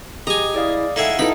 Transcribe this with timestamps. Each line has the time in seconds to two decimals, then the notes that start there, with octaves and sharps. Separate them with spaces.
0.27 G4 G#4 D#5 G#5 A#5
0.54 E4 G#4 D5 F5
0.96 D#4 E4 G#4 A4 F5 F#5
1.19 D#4 E4 A4 B4 B5